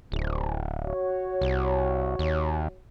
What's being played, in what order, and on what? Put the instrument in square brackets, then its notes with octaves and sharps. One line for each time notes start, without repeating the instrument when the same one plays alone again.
[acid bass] D1 [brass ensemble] C2
[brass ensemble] F#4 C#5
[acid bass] C2
D#2